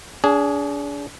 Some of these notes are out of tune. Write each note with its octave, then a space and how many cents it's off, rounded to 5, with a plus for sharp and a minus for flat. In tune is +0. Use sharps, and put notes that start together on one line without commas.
D4 -35 G#4 +0